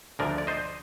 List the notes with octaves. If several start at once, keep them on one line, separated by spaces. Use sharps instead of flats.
D2 D3 F3 A#4 D5
D5
C5 D#5